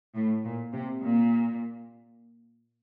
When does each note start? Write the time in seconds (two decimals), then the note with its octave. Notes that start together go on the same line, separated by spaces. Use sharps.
0.15 A2
0.44 A#2
0.73 C3
1.02 A#2